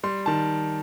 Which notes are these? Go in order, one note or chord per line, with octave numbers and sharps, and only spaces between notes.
G3 C6
D#3 A5